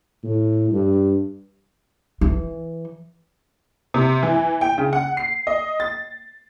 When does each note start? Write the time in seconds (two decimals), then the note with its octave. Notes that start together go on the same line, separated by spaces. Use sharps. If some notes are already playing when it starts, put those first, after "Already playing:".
0.24 A2
0.72 G2
2.21 E3
3.94 C3
4.23 E3
4.61 G5
4.78 C#3
4.93 F#5
5.17 C7
5.47 D#5
5.80 A6